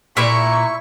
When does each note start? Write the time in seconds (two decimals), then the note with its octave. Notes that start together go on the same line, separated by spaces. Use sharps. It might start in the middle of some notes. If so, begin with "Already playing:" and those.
0.17 A#2 E4 E5 C#6